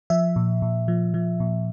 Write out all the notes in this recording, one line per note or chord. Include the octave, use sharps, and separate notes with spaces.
F3 E5
A#2
A#2
F3
F3
A#2